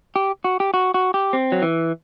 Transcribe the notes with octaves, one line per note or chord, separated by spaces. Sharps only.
G4
F#4
G4
F#4
F#4
G4
C4
F#3
E3